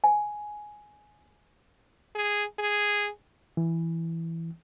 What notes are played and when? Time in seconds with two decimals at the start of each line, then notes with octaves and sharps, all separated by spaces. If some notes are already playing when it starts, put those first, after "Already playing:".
0.04 G#5
2.15 G#4
2.59 G#4
3.57 E3